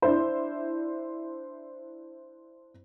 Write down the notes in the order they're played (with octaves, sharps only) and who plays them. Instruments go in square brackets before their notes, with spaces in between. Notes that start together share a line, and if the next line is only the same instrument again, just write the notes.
[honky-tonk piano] D4 E4 C5